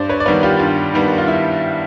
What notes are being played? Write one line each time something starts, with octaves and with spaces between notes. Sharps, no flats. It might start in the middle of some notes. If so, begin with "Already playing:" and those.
Already playing: G2 C5 D5
B4 C#5
D5
D#3 G3 B3 B4 C#5
F4 G4
G2 F4
D#3 G3 B3
F4
E4